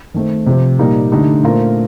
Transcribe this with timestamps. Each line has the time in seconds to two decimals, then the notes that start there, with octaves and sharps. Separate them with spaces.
0.14 D#3 A3 C4
0.46 C3 F3 C4 G4 C5
0.79 A#2 G3 A#3 D#4 G4
1.11 D3 A3 D#4 G4
1.43 A#2 A3 C4 F4 A#4